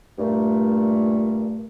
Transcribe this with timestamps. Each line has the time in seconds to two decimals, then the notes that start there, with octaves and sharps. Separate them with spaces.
0.19 G2 A#2 A3